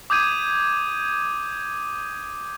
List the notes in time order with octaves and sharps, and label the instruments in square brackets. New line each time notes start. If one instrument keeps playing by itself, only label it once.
[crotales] D6 D#6 G6 G#6 D#7